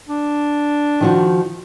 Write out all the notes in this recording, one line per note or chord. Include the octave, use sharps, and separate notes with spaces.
D4
D#3 F3 F#4